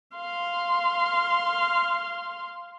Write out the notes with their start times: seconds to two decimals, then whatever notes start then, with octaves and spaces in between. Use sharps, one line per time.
0.16 F5 C6